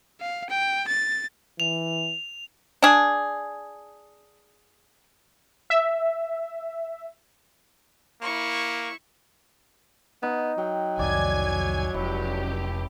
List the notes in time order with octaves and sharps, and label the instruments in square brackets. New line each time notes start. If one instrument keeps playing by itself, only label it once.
[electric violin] F5
G5
A6
[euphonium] E3 [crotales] F7
[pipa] D4 G#4
[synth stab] E5
[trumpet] A#3 [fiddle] E4 C#6
[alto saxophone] B3 [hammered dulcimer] D#4
[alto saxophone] F#3 [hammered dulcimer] G5
[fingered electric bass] C2 F2 D#3 [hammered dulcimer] D5 [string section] G#5 G#6
[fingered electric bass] F1 [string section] C#2 G4 [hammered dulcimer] E4